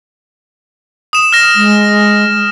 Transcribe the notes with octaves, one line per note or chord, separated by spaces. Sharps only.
D#6 E7
F6 A#6
G#3